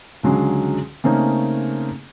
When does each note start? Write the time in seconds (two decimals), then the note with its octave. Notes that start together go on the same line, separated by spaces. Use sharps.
0.23 C#2 D3 F#3 G#3
1.04 C#3 A3 A#3 C4 C#4 D#4